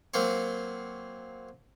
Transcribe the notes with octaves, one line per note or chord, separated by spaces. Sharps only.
F#3 A#3 C4 C#5